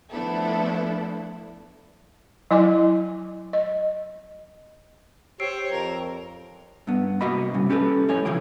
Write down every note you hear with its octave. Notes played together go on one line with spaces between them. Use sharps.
F3 A3 B3 D4 E4 A4
F#3 E4 D#5 G#5 D6
D#5
G4 C5 C#5 E6 C7 D7
F2 A#4
G2 B3
C2 A#3 F#4 D#5 B5
C2 G2 C#3
C#4 G4 A4 B4
F2 A2 C#5 G#5
C#3 E3 F3 G4